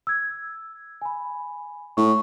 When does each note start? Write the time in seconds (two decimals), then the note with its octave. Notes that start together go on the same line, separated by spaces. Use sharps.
0.07 E6 G#6
1.02 G#5 B5
1.97 A2 C#6